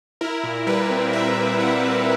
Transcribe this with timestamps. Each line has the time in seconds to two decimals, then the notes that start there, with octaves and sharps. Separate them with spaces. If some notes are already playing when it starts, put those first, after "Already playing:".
0.21 E4 A#4
0.44 A#2
0.67 G3 B4
0.90 C4
1.13 E4 E5
1.36 A#2
1.59 G3 F#5
1.82 C4